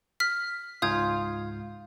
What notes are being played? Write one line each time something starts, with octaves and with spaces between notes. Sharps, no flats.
F6 B6
C#2 G#2 F4 F5 D#6 G6 G#6